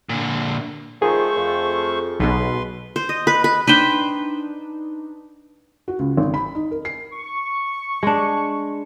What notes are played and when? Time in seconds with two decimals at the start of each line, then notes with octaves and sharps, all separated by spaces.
0.09 A#2 D3
1.02 D#3 F3 A3 G#4 C5 C#6
1.37 F2
2.20 B1 B2 B4 C6
2.96 C5
3.09 D#5
3.27 B4
3.44 B4
3.67 D4 D#4 B4 C5 G5
5.88 F#4
5.99 C#2
6.17 G#1
6.34 B5
6.55 D#4
6.71 A#4
6.85 C7
7.13 C#6
8.03 G#3 D4